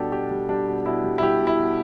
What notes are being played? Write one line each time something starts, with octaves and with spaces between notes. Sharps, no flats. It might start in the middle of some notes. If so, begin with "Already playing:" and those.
Already playing: B2 G3 D4 G4 A4
B2 G4
G3
G3 D4
B2
B2 E4
G3
E4
G3 G4
B2
E4
B2